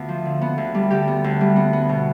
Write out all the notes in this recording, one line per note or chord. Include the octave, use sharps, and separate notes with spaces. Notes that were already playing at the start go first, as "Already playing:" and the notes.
Already playing: D2 B3 F4
F3
D3
B3
D2
G3
D3 G4
B3
D2
G3
B3
B3
B2